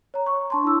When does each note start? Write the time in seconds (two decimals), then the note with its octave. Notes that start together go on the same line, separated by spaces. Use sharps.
0.14 C#5 A#5
0.26 C#6
0.50 D4 A5 C6
0.65 E4 E6